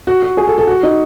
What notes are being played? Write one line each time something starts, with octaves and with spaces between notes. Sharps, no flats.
F#4
F#4
G#4
A4
A4
F#4
D#4